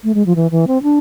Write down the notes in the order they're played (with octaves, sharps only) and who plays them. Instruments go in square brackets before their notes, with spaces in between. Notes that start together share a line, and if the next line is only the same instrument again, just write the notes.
[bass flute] A3
G#3
F3
E3
E3
C4
D4